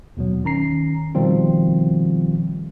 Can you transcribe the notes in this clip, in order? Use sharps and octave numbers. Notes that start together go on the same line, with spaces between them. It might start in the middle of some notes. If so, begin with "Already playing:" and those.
D#2 B2 F#3
D#3 C#4 A#5 C7
B2 D#3 F3 G3 C4 F4